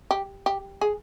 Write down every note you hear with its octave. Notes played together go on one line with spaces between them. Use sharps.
G4
G4
G#4